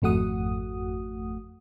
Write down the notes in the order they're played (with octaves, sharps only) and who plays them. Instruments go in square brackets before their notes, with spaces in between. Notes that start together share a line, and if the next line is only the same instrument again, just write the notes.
[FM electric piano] G#1 F2 A3 F#4 F#5 D#6